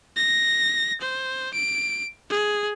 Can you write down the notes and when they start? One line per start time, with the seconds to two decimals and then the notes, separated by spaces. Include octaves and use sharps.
0.16 A#6
1.01 C5
1.54 D7
2.30 G#4